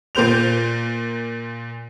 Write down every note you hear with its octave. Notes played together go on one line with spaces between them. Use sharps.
A#2 A#3 C5 G6 F7